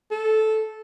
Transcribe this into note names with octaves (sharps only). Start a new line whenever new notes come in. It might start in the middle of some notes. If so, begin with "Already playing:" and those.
A4